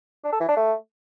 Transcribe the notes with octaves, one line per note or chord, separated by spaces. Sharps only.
D4
A4
E3
D4
A3